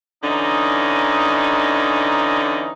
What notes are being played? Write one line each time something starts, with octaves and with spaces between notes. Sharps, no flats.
D3 E3 C#4 D#4